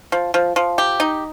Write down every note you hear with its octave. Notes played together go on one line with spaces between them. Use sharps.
F3
F3
F3
G4
D#4